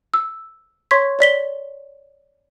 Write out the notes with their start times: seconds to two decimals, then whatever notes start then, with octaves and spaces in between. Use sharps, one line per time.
0.14 E6
0.91 C#5 C6 C#6 G#6 B6
1.19 C#5 D5 B6 G7